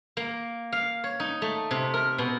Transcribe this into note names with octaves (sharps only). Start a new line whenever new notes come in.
A#3
F5
C#5
D#4
A3
C3
A#4
B2